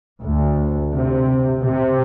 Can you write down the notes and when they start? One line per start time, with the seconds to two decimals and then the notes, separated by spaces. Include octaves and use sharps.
0.21 D2
0.93 C3
1.63 C3